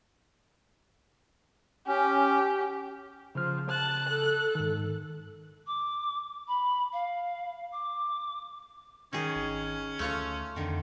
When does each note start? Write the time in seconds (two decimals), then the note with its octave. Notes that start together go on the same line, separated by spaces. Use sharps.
1.87 C#4 G4
3.35 C#3 F3 F6
3.70 A5 F#6
4.09 A4
4.55 G#2 D#3
5.67 D6
6.48 B5
6.93 F5
7.72 D6
9.13 D#3 C#4 G#4
9.35 G#1
9.99 D2 A3 F4 C#5
10.56 F2 D3 D#3